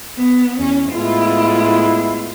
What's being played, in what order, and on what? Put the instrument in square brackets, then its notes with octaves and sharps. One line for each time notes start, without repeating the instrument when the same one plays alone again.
[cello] B3
E2 C#4
[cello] A2 F4 [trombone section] G#3 B3 E4